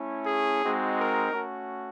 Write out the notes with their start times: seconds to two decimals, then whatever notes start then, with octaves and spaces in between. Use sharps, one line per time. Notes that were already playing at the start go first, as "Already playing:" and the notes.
Already playing: A3 C#4 E4
0.26 G#4
0.61 G#3 C4 D#4 F#4
0.96 A#4
1.31 A3 C#4 F#4